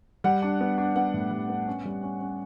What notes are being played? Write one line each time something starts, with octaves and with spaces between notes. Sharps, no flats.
G3 F#5
D4
B3
D4
B3 F#5
A2
G3
B3
C#4
G3
C#4
C#4